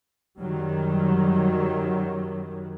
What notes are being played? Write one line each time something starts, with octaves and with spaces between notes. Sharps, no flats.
F#2 D#3 F#3 G3